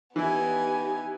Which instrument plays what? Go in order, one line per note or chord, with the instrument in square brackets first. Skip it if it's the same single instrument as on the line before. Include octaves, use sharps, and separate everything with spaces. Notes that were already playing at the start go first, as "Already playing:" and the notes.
[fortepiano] E3 E4 [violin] B3 G#5 [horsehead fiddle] D#4 G4